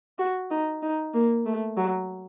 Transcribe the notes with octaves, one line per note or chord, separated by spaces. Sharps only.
F#4
D#4
D#4
A#3
A3
F#3